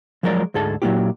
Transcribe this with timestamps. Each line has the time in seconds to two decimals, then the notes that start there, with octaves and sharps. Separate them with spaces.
0.23 F3 F#3 G#3 A#4 C#5 D5
0.54 D2 G#2 G#4 A4 A5
0.82 A#2 F#3 G#3 A#3 E4 G4